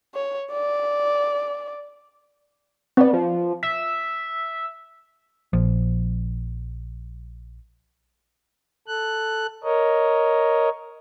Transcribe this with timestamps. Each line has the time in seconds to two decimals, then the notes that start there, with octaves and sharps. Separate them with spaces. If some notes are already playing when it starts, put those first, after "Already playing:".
0.15 C#5
0.52 D5
2.97 B3 C4 D5
3.13 F3
3.63 E5 B6
5.53 A#1 F3
8.88 A4 F#6
9.64 A#4 C#5 D#5